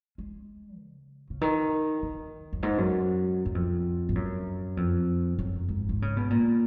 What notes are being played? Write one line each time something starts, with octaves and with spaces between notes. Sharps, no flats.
G#3
C#3
C#3
D#3
D#3
F#2
G#2
F#2
F#2
F2
G#2
F#2
F2
F#2
G#2
D#3
C#3
B2
A#2